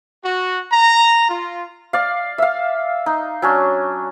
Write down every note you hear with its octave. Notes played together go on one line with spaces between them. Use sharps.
F#4
A#5
F4
D5 F5
E5 F5
D#4
F#3 C#4 D4